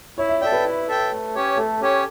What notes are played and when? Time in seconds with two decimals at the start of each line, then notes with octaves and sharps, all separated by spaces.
0.18 E4 C#5
0.29 E5
0.41 A4 D5 E5 G5
0.52 B4
0.64 E4
0.88 A4 E5 G5
1.11 A3
1.35 C#4 G4 C#5
1.57 A3 A4
1.81 C#4 G4 C#5